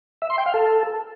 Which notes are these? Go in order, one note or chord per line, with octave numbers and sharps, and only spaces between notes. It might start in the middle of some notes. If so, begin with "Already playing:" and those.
E5
C6
G5
F5
A4